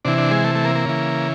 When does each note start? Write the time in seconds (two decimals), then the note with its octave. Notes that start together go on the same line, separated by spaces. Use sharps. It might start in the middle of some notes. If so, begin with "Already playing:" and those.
0.05 C3 E3 D4
0.18 D4
0.31 G#3
0.45 A3
0.55 A3
0.65 A#3
0.75 A#3
0.85 C#3 E3